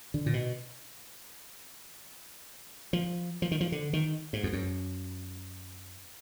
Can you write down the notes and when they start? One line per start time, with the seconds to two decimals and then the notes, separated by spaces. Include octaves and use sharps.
0.14 D3
0.26 A#2
0.34 B2
2.93 F3
3.42 F3
3.51 D#3
3.61 F3
3.72 D3
3.93 D#3
4.33 G#2
4.43 F2
4.53 F#2